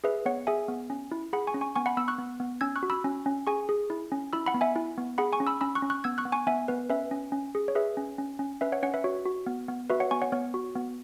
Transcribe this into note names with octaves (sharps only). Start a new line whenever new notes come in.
G#4 B4 E5
B3 C#5 F#5
G#4 E5 G#5
B3
C#4
E4
G#4 F#5 B5
G#5 C#6
C#4
G#5 C#6
B3 G#5 C#6
F#5 B5
B3 B5 E6
C#6 F#6
B3
B3
C#4 E6 G#6
C#6 F#6
F#4
B5 E6
C#4
C#4
G#4 G#5 C#6
G#4
E4
C#4
E4 B5 E6
F#5 B5
B3
E5 G#5
E4
B3
G#4 F#5 B5
G#5 C#6
C#4
B5 E6
C#4 B5 E6
C#6 F#6
C#4
C#6 F#6
B3 E6 G#6
C#6 F#6
B3
G#5 C#6
B3 E5 G#5
B3 B4
C#4 B4 E5
C#4
C#4
G#4
C#5
G#4 B4 E5
C#4
C#4
C#4
C#4 B4 E5
C#5 F#5
C#4 C#5 F#5
B4 E5
F#4 C#5
F#4
B3
B3
F#4 B4 E5
C#5 F#5
B3 G#5 C#6
C#5 F#5
B3 C#5
F#4
B3